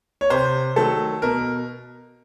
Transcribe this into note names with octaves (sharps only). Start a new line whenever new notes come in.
C#5
C3 C5
D#3 F#3 A3 A4
B2 A#4